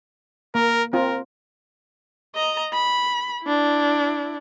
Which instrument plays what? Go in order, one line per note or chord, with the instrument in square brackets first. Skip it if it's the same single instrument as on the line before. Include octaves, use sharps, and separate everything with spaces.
[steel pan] A#3 [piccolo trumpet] A#4
[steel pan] C4 F4 [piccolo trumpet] A#4
[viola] D#5 A#5
B5
D4 E4